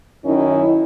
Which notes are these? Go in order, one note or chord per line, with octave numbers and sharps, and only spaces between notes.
F#2 D#3 F#3 C#4 D#4 E4